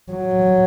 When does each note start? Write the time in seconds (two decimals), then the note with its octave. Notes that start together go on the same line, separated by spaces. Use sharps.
0.13 F#3